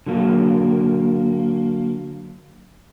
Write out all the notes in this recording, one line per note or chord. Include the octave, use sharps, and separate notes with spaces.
D3 F#3 A#3